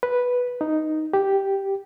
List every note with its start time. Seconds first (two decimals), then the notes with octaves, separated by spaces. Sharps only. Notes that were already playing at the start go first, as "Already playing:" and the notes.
0.03 B4
0.61 D#4
1.13 G4